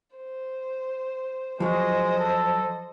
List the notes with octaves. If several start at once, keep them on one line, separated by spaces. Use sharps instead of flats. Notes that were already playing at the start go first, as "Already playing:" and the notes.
C5
F3 F#3 G#3 C5 D#5
A4